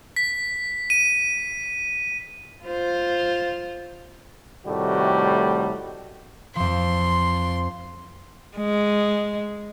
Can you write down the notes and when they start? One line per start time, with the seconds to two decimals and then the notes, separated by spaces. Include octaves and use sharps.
0.16 B6
0.90 D#7
2.64 F4 C5
4.66 A2 C3 D#3 G3 A3 F#4
6.56 F2 F3 C6
8.57 G#3